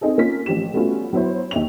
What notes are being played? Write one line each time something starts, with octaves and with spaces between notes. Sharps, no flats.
C4 D#4 G#4 A4
A#3 C#4 F4 B6
A1 F3 G4 E7
G3 A3 B3 C#4 F4 F#4
F#3 B3 E4 C5 C#5
D#2 D#4 E5 F7